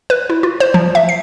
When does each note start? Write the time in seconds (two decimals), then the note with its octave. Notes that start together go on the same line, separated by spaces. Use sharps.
0.10 B4
0.30 E4
0.43 F4
0.60 C5
0.74 F3
0.95 E5
1.09 C7